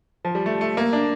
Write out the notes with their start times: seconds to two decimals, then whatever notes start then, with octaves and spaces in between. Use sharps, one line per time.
0.25 F3
0.35 G3
0.46 A3
0.61 A3
0.77 A#3
0.93 D4